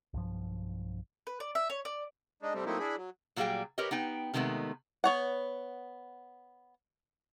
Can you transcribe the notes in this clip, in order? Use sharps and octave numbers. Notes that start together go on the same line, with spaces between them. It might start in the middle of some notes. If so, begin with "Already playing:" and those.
B1 G2 F3
B4
D5
E5
C#5
D5
G#3 D4 D#4
C3 G3 A3 C4
F#3 A3 A#3 C4 D#4 E4
D4 E4 G#4 B5
F#3
A#2 F#3 G3 G#4 F5 G5
G4 A#4 B4 C#5 D#5
B3 D#4 G5
C3 D#3 G#3 A3 B3
B3 C#5 F#5